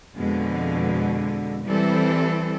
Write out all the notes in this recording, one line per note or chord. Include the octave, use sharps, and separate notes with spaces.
F2 B2 D3 G#3
E3 G3 C4 A4